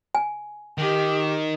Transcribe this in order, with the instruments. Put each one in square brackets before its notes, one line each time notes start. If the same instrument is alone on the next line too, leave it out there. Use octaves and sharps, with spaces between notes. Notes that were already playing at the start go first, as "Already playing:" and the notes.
[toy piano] G#5
[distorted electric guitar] D#3 [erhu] G4